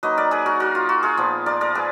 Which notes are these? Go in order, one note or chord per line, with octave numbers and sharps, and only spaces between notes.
F#3 A#3 D#4 B4 D#5
A#4 D5
G#4 B4
F#4 A#4
F#4 A#4
F4
F#4
F4 G#4
A#2 F3 B3
A#4 D5
A#4 D5
G#4 B4